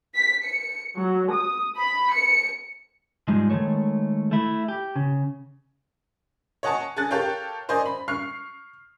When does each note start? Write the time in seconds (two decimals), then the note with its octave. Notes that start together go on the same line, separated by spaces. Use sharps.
0.15 B6
0.44 C#7
0.98 F#3
1.33 D#6
1.77 B5
2.14 C#7
3.28 G#2 F3 G3 G#3 D#4
3.50 D#3 E3 G#3 A3 C#5
4.31 A3 E4
4.68 G4
4.96 C#3
6.63 C#5 D#5 F#5 G#5 A5 C#6
6.96 G#4 A4 G#5 F#6 A6
7.11 G4 A4 A#4 C#5 F5 G5
7.69 A#4 C5 D5 D#5 G#5
7.86 B5
8.08 C#6 F6 C7